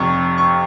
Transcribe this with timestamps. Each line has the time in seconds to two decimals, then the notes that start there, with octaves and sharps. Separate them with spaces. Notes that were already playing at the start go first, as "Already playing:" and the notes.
Already playing: F1 F2 C3 C#6
0.38 C#6